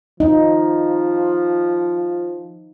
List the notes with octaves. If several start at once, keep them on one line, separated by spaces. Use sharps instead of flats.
F3 D#4